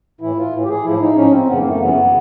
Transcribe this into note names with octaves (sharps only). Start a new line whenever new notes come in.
A2 E3 E4
F4
A2 E3
G4
G#4
A2 F3 E4
D#4
A2 F3 C#4
C4
F#2 C#3 E3 B3
A#3
A3
F#2 C#3 E3 B3